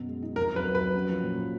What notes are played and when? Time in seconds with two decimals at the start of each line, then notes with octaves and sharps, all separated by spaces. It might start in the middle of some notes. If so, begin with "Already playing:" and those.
Already playing: F#2 B2 B3
0.08 G#3
0.22 D#4
0.36 F2 A#4
0.51 F#3
0.56 B4
0.66 F#3
0.75 B4
0.80 F#3
0.94 C#4
1.09 F3
1.23 A#2
1.38 F3